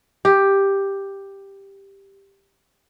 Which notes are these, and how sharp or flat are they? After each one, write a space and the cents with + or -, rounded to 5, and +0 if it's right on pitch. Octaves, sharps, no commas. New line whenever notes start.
G4 +5